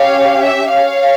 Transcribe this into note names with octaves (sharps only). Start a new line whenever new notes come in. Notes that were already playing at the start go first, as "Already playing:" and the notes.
Already playing: C#4 G4 C#5 F5
E5
C#5 F5